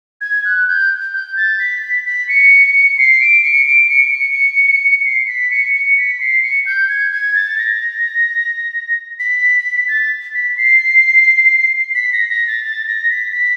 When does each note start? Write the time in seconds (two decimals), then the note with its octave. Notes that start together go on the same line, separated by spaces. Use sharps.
0.21 G#6
0.45 F#6
0.67 G6
1.14 G6
1.37 A6
1.59 B6
1.83 B6
2.06 B6
2.29 C#7
2.98 C7
3.21 D7
3.44 C#7
3.67 D7
3.90 C#7
4.08 D7
4.13 C#7
5.05 C7
5.27 B6
5.51 C#7
5.74 C#7
5.97 B6
6.20 C7
6.43 C#7
6.66 G6
6.89 G#6
7.12 G#6
7.35 A6
7.59 A#6
9.19 B6
9.88 A6
10.35 B6
10.57 C7
11.95 B6
12.13 A#6
12.29 A#6
12.48 A6
12.64 A6
12.87 A#6
13.10 B6
13.33 B6